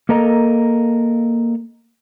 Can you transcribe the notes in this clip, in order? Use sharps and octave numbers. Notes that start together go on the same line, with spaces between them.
A#3 A4 A#4 D#5 A#5